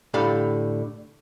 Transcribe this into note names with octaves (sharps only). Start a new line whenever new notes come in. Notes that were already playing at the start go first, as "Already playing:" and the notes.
A2 D3 G4 A4 F5 B5